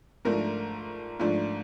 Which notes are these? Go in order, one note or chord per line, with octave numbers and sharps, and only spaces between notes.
G#2 F3 A3 D4 A#4
G#2 F3 A3 D4